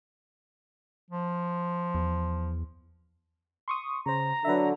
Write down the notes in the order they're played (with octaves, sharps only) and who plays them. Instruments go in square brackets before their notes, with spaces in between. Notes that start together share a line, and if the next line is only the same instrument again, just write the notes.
[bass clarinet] F3
[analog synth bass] E2
[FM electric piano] C6 C#6 D#6
[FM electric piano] C#3 C5 [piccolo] A#5
[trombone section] D3 F#3 [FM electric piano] B4 E5